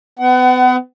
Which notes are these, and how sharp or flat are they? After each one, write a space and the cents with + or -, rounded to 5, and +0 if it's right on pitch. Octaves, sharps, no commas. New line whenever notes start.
B3 +35 F#5 +25